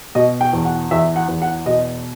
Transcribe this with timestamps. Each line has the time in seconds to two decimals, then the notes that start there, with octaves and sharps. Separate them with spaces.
0.15 B2 D#5
0.41 G5
0.53 E2
0.65 F#5
0.91 E2 E5
1.16 F#5
1.28 E2
1.42 F#5
1.66 B2 D#5